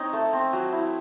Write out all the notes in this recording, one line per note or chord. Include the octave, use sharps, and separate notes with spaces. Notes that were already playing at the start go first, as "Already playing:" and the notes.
Already playing: C4 D#4 C#5 D#5
A3
C4
F#3
E4